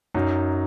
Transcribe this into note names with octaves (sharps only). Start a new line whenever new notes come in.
F#2 F#3 D#4